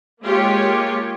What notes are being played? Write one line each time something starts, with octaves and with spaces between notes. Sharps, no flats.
G#3 A#3 F4 G4 C#5